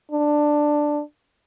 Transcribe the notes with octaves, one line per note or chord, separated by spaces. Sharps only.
D4